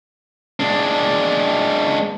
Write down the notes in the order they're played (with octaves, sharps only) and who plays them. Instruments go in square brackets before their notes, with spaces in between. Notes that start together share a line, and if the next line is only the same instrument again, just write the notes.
[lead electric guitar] G#3 D4